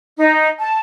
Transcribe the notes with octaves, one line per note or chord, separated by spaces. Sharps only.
D#4
A5